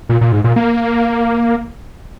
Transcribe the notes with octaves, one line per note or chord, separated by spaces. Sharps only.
A#2
A#2
G#2
A#2
A#3